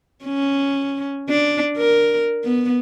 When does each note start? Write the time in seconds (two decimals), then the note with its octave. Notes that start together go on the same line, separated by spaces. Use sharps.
0.25 C#4
1.29 D4
1.77 A#4
2.44 B3